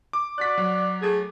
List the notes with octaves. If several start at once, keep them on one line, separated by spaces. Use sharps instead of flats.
D6
F#4 D5 F#6 B6
F#3
A3 G#4